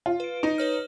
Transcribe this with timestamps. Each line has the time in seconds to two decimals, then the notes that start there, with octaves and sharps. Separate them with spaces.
0.06 F4
0.20 B4 D7
0.43 D#4
0.58 B4 C#5 F6